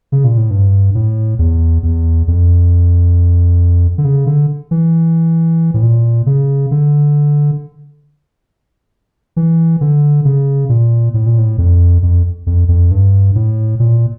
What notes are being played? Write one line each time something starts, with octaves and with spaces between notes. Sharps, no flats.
C#3
A#2
A2
G2
A2
E2
E2
F2
D3
C#3
D3
E3
A2
A#2
C#3
D3
E3
D3
C#3
A#2
A2
A#2
A2
F2
F2
F2
F2
G2
A2
A#2